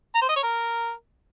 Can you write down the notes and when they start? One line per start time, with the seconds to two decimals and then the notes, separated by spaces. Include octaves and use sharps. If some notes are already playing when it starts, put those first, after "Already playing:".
0.15 A#5
0.22 C5
0.29 D#5
0.36 C#5
0.43 A#4